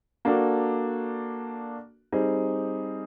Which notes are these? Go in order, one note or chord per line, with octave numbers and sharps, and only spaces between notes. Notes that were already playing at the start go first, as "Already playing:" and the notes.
A#3 D4 F#4 A4
G3 C4 D#4 G#4